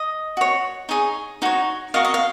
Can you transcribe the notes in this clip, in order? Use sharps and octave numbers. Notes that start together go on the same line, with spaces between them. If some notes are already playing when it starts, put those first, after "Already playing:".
Already playing: D#5
F#4 C#5
D#4 G#4 C#5
D#4 F#4 C#5
F#4 A#4 D#5 F5
D#5
F5